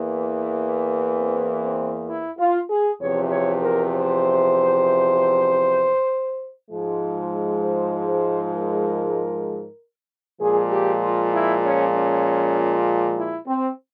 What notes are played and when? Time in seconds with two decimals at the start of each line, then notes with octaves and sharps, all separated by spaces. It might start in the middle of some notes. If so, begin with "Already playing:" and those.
Already playing: E2 E3 A#3
1.16 C4
1.62 C4
2.08 E4
2.38 F4
2.70 G#4
3.01 E2 C3 F3 C#5
3.31 C#5
3.62 A#4
3.93 C5
6.70 G#2 F3 G#3
7.63 C5
8.09 C5
8.55 A#4
10.40 A#2 F3 G#3 G#4
10.70 G4
11.01 F4
11.32 E4
11.63 C#4
11.94 C#4
13.17 E4
13.48 C4